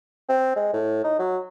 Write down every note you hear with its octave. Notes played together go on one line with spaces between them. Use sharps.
C4
G#3
A2
D#4
F#3